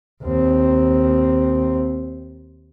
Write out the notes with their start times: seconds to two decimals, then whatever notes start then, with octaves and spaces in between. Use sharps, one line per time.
0.23 D#2 C4